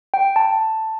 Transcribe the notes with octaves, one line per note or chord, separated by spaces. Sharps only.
G5
A5